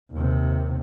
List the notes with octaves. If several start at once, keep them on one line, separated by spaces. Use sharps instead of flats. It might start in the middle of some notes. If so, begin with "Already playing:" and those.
D#2 C3